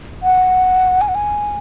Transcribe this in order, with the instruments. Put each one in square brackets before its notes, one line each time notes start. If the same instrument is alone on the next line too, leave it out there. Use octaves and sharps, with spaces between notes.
[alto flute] F#5
G#5
F#5
G#5